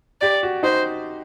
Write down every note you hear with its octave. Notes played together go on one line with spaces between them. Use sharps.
G4 D5
F#4
D#4 C5